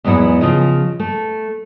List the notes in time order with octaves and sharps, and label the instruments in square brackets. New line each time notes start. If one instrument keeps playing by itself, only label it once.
[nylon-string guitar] E2 G#2 F#3 B3 E4 F#5
C#3 F3 F4 D#5
A3